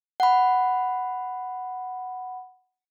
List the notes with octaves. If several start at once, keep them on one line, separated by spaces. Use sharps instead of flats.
F#5 B5